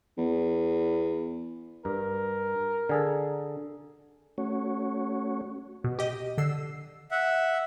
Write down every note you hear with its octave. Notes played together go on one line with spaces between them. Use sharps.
E2
G2 A#4
D3 G#4 A4
A3 C#4 F#4 C#5
B2
G4 D#5
D3 E6 C7
E5 F#5